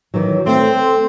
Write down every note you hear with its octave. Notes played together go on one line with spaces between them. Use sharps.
D#3 E3 F#3
A3 C4